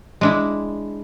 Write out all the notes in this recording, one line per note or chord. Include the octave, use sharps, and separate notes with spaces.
G#3 D4 E4